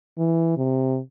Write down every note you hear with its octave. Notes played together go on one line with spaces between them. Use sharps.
E3
C3